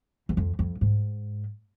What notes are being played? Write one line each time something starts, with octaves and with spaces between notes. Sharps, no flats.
E2
F2
F2
G#2